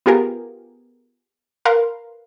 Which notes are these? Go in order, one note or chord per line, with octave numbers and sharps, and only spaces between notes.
B3 F4 G4 G#4 A#4
A#4 B4 F5 C6